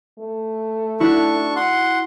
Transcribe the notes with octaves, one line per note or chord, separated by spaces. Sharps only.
A3
D4 E4 F#4 C#6
F#5 C6